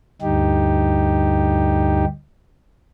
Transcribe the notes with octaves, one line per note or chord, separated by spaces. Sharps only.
D2 G2 D#4 G4